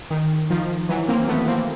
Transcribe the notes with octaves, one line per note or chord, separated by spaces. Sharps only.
D#3
D#3 F3
E3 F#3
A#3 C4
A3 B3
A#3 C4